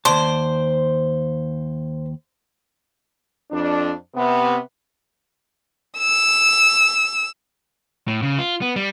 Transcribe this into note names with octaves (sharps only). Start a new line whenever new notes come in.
D#2 C5 D5 A5
F2 D4
C3 B3
E6
A2
C#3
F4
B3
G3